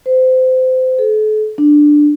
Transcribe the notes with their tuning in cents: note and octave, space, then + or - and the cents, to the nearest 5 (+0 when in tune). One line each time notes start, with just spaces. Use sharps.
C5 -25
A4 -40
D4 +10